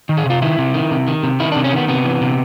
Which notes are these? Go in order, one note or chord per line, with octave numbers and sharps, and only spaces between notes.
D#3
G#4
C3 F4
D#3 E4
C3
D#3
C3
D#3
C3
D#3 E4
D4
C3
C#4
D#3 B3
C3 B3
E3
C3